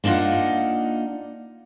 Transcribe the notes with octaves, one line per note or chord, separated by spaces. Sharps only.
A#3 D4 D#4 F4 F#5